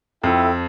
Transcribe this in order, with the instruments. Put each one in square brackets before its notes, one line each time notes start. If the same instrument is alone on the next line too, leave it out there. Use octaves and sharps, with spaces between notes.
[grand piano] F2 [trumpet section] E4 A4 E5 G5